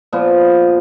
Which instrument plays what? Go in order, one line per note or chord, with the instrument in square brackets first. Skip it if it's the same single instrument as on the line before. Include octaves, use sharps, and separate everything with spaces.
[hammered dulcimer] A#2 F3 B3